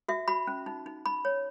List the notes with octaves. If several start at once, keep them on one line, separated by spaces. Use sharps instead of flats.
F#4 E5
F#4 B5
C#4
D#4
D#4
D#4 B5
C#5